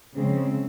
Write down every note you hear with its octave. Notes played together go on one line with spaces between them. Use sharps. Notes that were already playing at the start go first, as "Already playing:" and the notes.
C#3 F3 G#3 C4